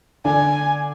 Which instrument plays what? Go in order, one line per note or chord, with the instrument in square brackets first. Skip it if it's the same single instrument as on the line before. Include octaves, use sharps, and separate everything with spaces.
[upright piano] D3 D4 [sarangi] G#5